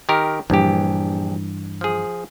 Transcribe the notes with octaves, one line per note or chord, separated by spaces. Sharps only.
D#3 G4 A#4
A#1 G2 E3 G4
F3 G#4